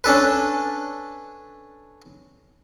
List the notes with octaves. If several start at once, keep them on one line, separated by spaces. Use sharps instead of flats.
C#4 D4 A4 B4